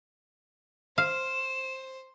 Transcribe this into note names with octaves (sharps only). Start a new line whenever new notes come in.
C5 F5 E7